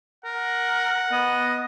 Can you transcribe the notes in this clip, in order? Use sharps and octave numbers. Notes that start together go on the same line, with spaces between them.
A#4 F#5
B3 D#5